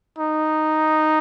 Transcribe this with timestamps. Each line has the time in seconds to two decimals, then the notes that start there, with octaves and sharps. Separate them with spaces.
0.19 D#4